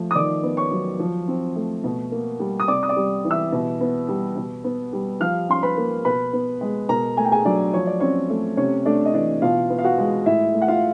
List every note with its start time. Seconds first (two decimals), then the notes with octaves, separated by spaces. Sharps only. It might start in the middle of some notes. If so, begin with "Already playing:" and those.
Already playing: F3 A3
0.11 D#6
0.15 D#3 D5 D6
0.43 B3
0.57 C#5 C#6
0.71 F#3
0.99 F3
1.28 C4
1.56 A3
1.84 B2
2.12 A#3
2.39 G3
2.60 D#6
2.68 C3 D5 D6
2.83 D#6
2.89 D5 D6
2.96 G3
3.25 E3
3.31 E5 E6
3.52 B2
3.81 B3
4.08 G3
4.36 B2
4.64 B3
4.93 G3
5.20 F3 F5 F6
5.49 C#4 C6
5.63 B4 B5
5.77 A#3
6.05 B2 B4 B5
6.33 B3
6.61 G#3
6.89 B2 A#4 A#5
7.17 A3 G#5
7.25 G5
7.31 G#4 G#5
7.45 F#3 D4 D5
7.74 F3 C#5
7.87 D5
8.00 C4 C#4 C#5
8.30 A3
8.57 C3 C#4 C#5
8.86 A3 D4 D5
9.05 D#5
9.14 E3 D4 D5
9.42 B2 F4 F5
9.70 B3
9.78 F5
9.84 F#4 F#5
9.98 G#3
10.26 A2 E4 E5
10.54 A3
10.62 F#5
10.68 F4 F5